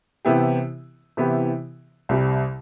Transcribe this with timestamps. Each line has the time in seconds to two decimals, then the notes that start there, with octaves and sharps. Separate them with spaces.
0.25 C3 E3 B3 E4 G4
1.17 C3 E3 B3 E4 G4
2.09 C2 C3 G3